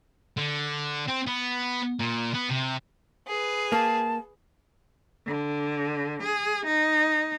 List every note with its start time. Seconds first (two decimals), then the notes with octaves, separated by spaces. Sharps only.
0.37 D3
1.08 C4
1.27 B3
2.00 A#2
2.34 B3
2.50 C3
3.28 G#4 B4
3.72 A#3 A5
5.27 D3
6.23 G#4
6.67 D#4